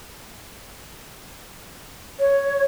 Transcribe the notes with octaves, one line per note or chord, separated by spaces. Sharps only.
C#5